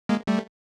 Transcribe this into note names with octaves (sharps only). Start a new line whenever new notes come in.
G#3 A#3
G3 A3